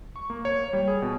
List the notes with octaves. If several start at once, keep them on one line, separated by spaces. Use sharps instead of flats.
C#6
A#3
C#5
G3
G#4
B2